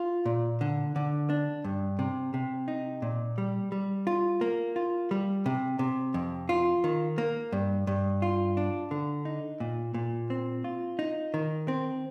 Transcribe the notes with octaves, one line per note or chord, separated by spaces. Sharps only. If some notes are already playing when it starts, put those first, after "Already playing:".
Already playing: F4
A#2
D3
D3
D4
G2
C3
C3
D#4
A#2
G3
G3
F4
A#3
F4
G3
C3
C3
F2
F4
D#3
A#3
G2
G2
F4
D4
D3
D#4
A#2
A#2
C4
F4
D#4
D#3
C4